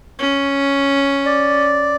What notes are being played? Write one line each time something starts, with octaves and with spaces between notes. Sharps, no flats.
C#4
D5